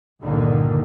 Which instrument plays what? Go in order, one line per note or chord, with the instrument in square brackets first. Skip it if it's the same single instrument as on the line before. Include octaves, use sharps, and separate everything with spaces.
[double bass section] C#2 G2 A#2 D3 D#3 A#3